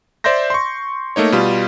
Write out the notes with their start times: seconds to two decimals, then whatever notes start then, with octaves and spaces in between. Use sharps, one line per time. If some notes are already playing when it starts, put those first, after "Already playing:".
0.24 C5 D5 E5 C6 G6 A#6
0.50 C6 C#6
1.16 A3 A#3 D#4 C#5
1.32 B2 G3 F4